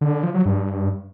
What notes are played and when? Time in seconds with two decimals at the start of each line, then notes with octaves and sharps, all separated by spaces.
0.01 D3
0.12 D3
0.23 F3
0.34 F#3
0.45 G2